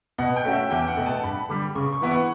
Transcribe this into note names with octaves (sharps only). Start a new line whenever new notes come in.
B2 F#5
G5
A3 C#4 F#4
E5
E2 G5
F#5
B2 A3
A5
G2 B5
D3 G3 D6
C#3 C#6
C#6
E3 B3 E4
F#5